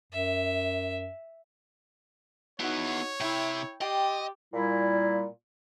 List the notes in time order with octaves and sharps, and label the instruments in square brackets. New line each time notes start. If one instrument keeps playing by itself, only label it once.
[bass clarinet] F#2 [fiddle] E5
[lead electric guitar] B3 E4 [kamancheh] D#4 F#4 [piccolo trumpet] C#5
[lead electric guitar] C3 E5 [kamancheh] E4 [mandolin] G5
[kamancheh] G4 [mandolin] D5 G5 C6 [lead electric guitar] D#5
[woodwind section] A#2 G3 E4